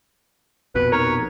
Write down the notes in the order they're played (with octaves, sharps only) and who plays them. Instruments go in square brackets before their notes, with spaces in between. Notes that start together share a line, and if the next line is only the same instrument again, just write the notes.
[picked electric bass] A#1 F2 B2 [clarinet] B4
[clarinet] D#4 [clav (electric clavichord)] A#4 [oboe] C#5